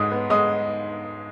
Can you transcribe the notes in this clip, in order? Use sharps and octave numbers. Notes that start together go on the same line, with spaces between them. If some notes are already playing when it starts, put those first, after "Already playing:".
Already playing: G#2 G#3 D#6
B3
G#3 D#6